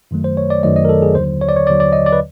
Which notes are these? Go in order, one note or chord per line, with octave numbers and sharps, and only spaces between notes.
F#2 D#3 F#3 A3
C5
C#5
D5
F#2 D#3 F#3 A3 D#5
D#5
A#4
A4
G#4
D#2 D3 F#3 C5
C#5
D5
C#5
D#2 D3 F#3 D5
D5
D#5
D5
B4